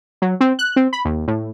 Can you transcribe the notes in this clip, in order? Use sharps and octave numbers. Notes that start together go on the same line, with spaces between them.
F#3
C4
F#6
C4
B5
D#2
A2